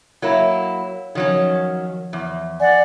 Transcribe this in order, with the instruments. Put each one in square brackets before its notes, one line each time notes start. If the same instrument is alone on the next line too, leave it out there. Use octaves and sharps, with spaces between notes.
[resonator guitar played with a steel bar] F#3 A#3 E4 [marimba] C#5
[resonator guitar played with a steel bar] D#3 F#3 C#4 [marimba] F3 C#5
[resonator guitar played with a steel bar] E2
[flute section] D5 F#5 [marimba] G#5